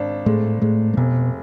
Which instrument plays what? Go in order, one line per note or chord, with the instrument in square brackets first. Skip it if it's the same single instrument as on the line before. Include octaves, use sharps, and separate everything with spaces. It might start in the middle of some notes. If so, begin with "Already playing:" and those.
Already playing: [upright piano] G#1 D4
[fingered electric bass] A2 A3 [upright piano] G#3
[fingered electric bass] A2 A3 [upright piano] G#3
[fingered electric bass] A3
[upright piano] F1 [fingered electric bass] B2 B3